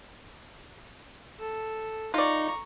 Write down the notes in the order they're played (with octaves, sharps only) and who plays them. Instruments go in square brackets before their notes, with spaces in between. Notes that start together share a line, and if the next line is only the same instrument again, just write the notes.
[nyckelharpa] A4
[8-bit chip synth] D#4 [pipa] F4 D5 [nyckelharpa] A#5 C#6